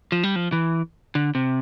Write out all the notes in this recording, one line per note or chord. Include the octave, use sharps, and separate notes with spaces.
F3
G3
F3
E3
D3
C3